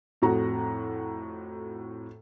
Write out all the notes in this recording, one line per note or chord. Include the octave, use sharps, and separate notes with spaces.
F2 A2 F#4 A#5